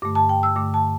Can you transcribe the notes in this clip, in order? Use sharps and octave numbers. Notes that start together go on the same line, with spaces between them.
G2 D3 A3 D6
A5
G5
E6
G2 D3 A3 D6
A5